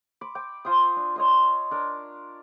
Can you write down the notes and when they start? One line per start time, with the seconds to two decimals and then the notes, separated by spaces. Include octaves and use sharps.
0.21 B5 D6
0.35 G5 D6
0.65 F4 C5 G#5 D#6
0.96 D4
1.16 C#5 D#5 C6
1.71 D4 A#4